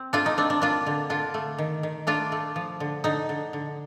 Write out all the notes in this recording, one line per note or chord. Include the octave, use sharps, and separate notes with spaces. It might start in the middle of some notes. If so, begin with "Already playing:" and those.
Already playing: C4
A3 D4 F4
D#4
C4 D4
D4
A#3 D4 F4
D3
D3 D4 F4
A3
D#3
D#3
A3 D4 F4
A3
F3
D3
D3 D#4
D3
D3